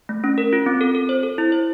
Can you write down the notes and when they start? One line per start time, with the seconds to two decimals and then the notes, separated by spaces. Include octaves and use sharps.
0.09 A3
0.24 C#4
0.38 A#4
0.53 F4
0.66 C4
0.81 A4
0.95 A4
1.09 C5
1.23 A4
1.38 E4
1.52 C5